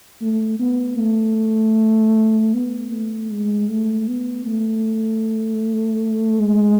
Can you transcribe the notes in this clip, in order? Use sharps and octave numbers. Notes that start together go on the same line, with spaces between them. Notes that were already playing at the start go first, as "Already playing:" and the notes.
A3
B3
A3
B3
A3
G#3
A3
B3
A3
G#3